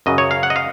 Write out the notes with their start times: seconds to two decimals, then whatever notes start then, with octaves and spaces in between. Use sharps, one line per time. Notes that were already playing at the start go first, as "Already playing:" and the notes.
0.06 F#2 C#3 F#3 D#5
0.18 C#5
0.31 F5
0.43 F#5
0.50 D#5
0.56 F5